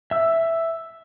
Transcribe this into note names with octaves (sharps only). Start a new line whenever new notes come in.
E5 E6